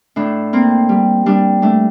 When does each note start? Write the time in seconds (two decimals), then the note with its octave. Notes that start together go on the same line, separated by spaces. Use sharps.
0.16 A2 D4
0.53 A#3 C4
0.89 G3
1.26 G3 D4
1.62 A3 D4